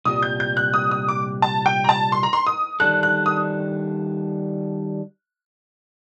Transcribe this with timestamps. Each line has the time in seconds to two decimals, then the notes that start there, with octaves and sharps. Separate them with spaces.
0.05 C2 A#2 G3 D#6
0.23 G6
0.40 G6
0.57 F#6
0.74 D#6
0.91 D#6
1.09 D6
1.42 A5
1.66 G5
1.84 A#5
1.89 A5
2.12 C6
2.23 A#5
2.33 C6
2.47 D#6
2.80 D#3 G3 D4 A4 F#6
3.03 F#6
3.26 D#6